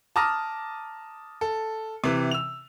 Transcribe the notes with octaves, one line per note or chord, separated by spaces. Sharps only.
A5 A#5 D6 D#6 F6 A#6
A4
C3 E3
E6 F7